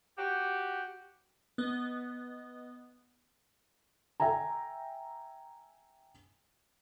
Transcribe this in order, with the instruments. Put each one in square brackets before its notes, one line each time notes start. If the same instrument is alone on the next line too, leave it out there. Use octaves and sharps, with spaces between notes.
[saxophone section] F#4 G4
[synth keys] B3 D#5
[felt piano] E5 G5 G#5 A#5